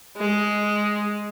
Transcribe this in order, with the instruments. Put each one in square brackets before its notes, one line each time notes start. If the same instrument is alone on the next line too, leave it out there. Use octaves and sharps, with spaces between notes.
[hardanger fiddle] G#3